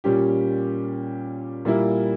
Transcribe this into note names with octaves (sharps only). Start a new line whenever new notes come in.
A#2 G3 C#4 G4
A#2 G3 A#3 E4